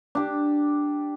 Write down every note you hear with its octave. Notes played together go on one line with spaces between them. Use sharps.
D4 G4